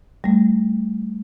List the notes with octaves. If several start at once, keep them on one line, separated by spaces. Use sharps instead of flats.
G3 A3